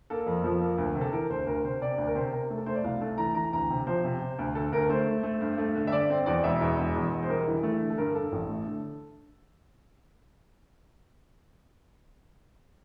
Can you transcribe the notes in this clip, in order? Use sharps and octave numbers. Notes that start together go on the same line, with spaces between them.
A#3 A4
F2
F3
A#3
D2
C3
A4
E3 A#4
D2 C5
D2 A#4
C3 C5
C3 D5
D2
A#4
C3 C5
C3 A#4
A3
A4
A3 C5
D5
C2 F5
A3 A5
E3 A#5
E3 A#5
D2 A#5
C3
F3 C5
C3
C3
D2
D2 A4
D2 A#4
A3 C5
A3
A3
G2
A3
D3
E5
G2 D5
C4
E2 D5
E1 E5
E2
E1
E2
E1
C5
G3 A#4
E3
A3
D3
A4
G2 A#4
G2 A4
A1
A3
D3